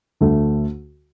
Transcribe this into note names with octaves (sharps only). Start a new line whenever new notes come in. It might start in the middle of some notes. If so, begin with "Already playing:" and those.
D2 D3 A3